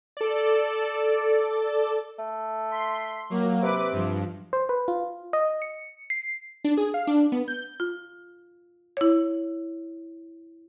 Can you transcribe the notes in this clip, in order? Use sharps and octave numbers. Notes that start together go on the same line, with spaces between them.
A4 D5
A3
C6 B6
F#3 A#3
C3 B4 D6
G2 F3
C5
B4
F4
D#5
C#7
C7
D4
G#4
F5
D4
B3
G6
F4
E4 C#5